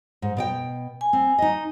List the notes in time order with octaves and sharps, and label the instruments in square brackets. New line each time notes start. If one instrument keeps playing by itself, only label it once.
[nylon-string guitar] G#2
B2 D5 G5
[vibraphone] G#5
[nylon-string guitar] C4
D#4 D#5